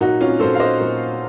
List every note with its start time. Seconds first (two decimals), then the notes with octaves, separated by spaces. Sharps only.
0.01 A#2 F#3 D#4 F#4
0.21 C#4 F4
0.40 A#2 F#3 A4 C5
0.55 F5
0.60 C5 D#5
0.80 A#2 F#3